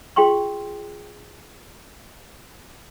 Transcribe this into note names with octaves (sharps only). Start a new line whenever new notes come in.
F4 G#4 G5 C6 C#6